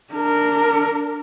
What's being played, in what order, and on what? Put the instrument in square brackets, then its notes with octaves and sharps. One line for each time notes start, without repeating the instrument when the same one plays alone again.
[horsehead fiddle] D4 A#4